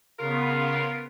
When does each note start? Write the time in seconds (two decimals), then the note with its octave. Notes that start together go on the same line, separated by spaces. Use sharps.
0.19 C#3 B3 F4 A#4